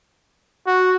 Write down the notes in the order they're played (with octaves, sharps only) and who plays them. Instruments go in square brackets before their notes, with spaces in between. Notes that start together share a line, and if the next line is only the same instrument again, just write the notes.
[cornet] F#4